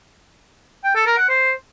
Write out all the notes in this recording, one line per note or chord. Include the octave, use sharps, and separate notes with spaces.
G5
A4
A#4
F#5
C5